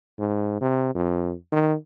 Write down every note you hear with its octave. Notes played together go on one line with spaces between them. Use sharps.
G#2
C3
F2
D#3